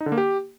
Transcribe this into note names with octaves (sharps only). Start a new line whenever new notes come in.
D#4
D3
A#3
G4